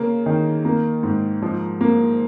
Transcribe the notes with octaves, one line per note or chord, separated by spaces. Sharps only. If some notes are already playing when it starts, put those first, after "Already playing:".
Already playing: C#3 A#3
D#3
A#3
G#2
F3
A#3